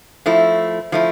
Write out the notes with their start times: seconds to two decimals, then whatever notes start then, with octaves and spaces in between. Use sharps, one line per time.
0.26 F3 A3 E4
0.92 F3 A3 E4